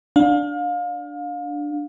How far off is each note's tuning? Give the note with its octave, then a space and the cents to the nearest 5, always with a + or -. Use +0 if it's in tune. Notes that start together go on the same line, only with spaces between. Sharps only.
D4 +0 F5 +30